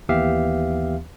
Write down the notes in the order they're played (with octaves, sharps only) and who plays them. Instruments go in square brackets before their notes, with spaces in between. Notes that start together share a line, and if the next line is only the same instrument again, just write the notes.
[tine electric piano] D#2 E3 B3 G4 E5 F5